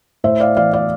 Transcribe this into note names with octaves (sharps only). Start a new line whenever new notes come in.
A2 C5 E5
D5 F5
E3 D5 F5
D5 F5